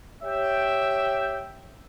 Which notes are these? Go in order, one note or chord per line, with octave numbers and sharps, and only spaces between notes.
G4 C#5 E5 G5